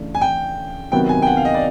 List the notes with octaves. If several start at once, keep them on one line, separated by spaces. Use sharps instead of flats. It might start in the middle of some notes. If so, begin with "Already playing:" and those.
Already playing: C#3 E3 A3 D4
G#5
G5
C3 D#3 F#3 B3 G5
G#5
G5
F#5
F5
D#5
D5